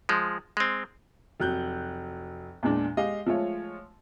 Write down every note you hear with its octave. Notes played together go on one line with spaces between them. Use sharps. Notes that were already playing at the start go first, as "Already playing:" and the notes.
F3 G#3
G#3 C4
F1 F#3 F#6 G6
E2 A#2 G#3 D4
G#3 G4 D#5 F5
F3 G#3 A3 F4 C#5